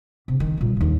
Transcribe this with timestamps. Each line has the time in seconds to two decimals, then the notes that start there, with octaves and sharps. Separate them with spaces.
0.28 C3
0.40 D#3
0.57 A#2 G3
0.77 A1 D#2